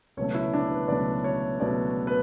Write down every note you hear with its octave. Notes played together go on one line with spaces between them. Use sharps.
C#2 B2 F#3 A3 C#5
E4
D4
B4
C#2 B2 F#3 A3 D5
C#5
C#2 B2 F#3 A3 D5
B4